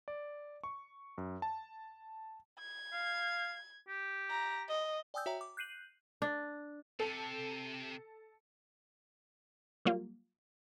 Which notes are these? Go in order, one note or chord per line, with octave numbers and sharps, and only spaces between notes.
D5
C#6
F#2
A5
G#6
F5
G4
A#5
D#5
D5 G5 G#5 D#6 E6 G6
F#4 C#5 E5 G5 A#5
D6
F#6 G6 C7 D#7 F#7
D4
C3 A4
F#3 G3 A#3 F4